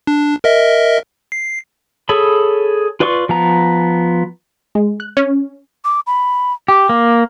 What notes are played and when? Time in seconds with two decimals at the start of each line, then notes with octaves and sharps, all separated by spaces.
0.07 D4
0.44 A#4 D#5 E5
1.32 C7
2.09 G#4 A4 C#5 B5
3.00 F4 B4 D5 C6 C#6
3.29 F3 B3 A#5
4.75 G#3
5.00 F#6
5.17 C#4
5.84 D6
6.07 B5
6.68 G4 D6
6.89 A#3